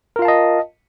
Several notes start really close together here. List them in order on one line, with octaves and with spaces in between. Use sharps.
A#4 F4 F5 A5 D#5